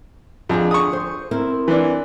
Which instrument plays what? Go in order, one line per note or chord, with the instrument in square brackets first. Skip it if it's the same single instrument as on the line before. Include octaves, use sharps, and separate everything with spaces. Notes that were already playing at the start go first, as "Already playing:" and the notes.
[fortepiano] F2 [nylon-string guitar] D3 D4 G#4
[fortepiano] C#6 D#6
[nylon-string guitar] C5
C4 E4 A#4
[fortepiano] E3 D4